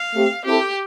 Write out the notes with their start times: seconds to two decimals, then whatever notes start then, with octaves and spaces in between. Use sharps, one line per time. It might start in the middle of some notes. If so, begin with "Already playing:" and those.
Already playing: F5
0.15 A3 C4 G4
0.46 C4 E4 G4 A4